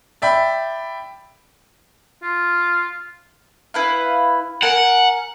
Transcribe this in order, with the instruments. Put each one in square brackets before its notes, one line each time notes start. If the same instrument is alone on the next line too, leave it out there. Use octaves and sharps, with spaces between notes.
[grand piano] D5 E5 G5 B5
[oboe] F4
[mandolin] E4 B4 F5
[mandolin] A#4 G#5 [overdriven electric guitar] F#5